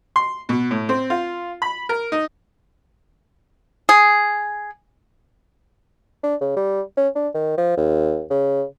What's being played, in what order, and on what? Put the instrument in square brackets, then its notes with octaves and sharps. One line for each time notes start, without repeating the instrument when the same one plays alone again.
[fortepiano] C6
B2
A2
C4
F4
B5
A#4
D#4
[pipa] G#4
[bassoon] D4
C#3
G3
C#4
D4
D#3
F3
D#2
C#3